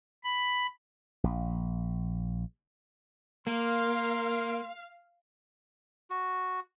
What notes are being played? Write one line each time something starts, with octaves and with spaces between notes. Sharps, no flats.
B5
A#1
A#3 A#4 F5 C6
F#4